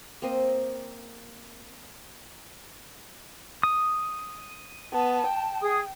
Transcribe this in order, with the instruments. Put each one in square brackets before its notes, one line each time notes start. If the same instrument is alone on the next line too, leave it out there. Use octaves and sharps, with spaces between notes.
[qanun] A#3 C4 C5 D#5
[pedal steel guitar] D#6
[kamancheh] B3 [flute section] A5
[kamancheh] G5
[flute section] G#4 D#6